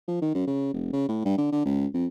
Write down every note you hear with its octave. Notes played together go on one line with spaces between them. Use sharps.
F3
D#3
F#2
C#3
F1
C#3
A2
G2
D3
D3
C#2
F2